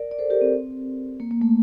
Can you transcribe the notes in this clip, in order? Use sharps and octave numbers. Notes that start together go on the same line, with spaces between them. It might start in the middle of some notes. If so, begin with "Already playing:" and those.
Already playing: A#4 D5
D5
A4 C5
G4 A#4
C4
A#3
A#3
A3